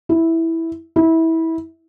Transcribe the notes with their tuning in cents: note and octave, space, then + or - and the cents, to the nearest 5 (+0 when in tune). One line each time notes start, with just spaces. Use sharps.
E4 -5
E4 -20